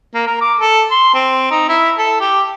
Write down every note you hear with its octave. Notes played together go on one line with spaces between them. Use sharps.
A#3
A#4
D6
A4
C6
C4
D#4
E4
A4
G4